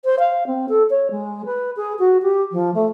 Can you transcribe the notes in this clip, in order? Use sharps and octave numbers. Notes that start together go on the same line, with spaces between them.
C5
F5
C4
A4
C#5
G#3
B4
G#4
F#4
G4
F3
A3